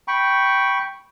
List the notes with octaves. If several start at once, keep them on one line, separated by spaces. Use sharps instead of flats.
G5 B5 C#6